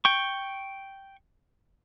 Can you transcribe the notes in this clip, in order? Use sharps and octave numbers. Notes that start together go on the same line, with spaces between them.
G5 C#6